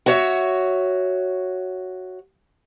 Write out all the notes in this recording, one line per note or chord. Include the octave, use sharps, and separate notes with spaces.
F#4 C#5 E5